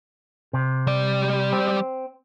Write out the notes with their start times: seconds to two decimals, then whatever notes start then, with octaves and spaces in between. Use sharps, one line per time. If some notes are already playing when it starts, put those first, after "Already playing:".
0.53 C3
0.87 G3 D5
1.53 C4